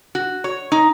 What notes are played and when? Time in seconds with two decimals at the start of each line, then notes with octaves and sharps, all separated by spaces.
0.15 F#4
0.44 C#5
0.72 D#4